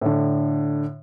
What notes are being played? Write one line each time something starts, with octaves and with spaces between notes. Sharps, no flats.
A2 D3